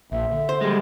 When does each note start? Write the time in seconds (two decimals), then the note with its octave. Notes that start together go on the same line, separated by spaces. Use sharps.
0.12 A#1 E5
0.32 D3
0.49 C5
0.61 G3 G#3